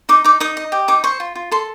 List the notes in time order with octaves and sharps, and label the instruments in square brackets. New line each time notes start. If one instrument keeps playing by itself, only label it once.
[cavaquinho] D#4 D6
D#4 D6
D#4 D#6
D#5
G4
D#4 D6
C5 C#6
F4
F4
A4 C6